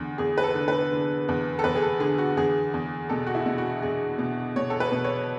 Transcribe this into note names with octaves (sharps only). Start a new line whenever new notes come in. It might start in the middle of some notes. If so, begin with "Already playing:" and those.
Already playing: E2 D3
E2 G#4
B4
A4
D3
B4
D3
E2
A4
E2 B4
G#4
A4
D3 G#4
F#4
E2 G#4
E2
B2 A4
F#4
E4
B2
F#4
E2 G#4
B2
B2 C#5
A4
B4
B2
C#5